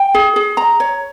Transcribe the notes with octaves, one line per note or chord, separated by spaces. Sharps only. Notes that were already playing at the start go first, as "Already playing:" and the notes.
Already playing: G5
G#4
G#4
A#5
C#5